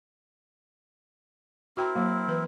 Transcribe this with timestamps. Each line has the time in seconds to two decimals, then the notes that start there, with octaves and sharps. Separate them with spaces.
1.77 C4 E4 F#4 A#4 G5 A#5
1.96 F#3 A#3
2.28 E3 B4